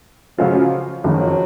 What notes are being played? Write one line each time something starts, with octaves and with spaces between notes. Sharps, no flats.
C#3 F3 F#3 C#4 F4
F#1 F2 D#3 F#3